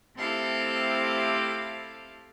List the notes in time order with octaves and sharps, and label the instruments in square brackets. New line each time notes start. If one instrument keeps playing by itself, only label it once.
[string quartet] A3 C4 E4 G4 A4 F5